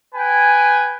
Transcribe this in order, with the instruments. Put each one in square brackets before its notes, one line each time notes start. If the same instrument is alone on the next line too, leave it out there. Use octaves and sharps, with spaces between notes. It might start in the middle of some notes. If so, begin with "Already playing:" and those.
[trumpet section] B4 G5 G#5